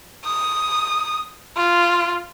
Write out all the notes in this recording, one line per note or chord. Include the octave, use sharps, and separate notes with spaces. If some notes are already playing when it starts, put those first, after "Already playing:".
D#6
F4